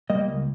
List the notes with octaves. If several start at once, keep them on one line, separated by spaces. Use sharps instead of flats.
G3 A#3 D#5
C#2